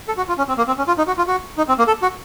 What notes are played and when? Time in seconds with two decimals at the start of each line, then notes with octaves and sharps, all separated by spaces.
0.08 A4
0.17 F#4
0.28 F4
0.38 C#4
0.48 C4
0.58 A#3
0.67 C4
0.78 C#4
0.88 F4
0.98 D#4
1.07 F#4
1.18 F4
1.27 F#4
1.58 D#4
1.68 C4
1.78 A#3
1.87 A4
2.02 F#4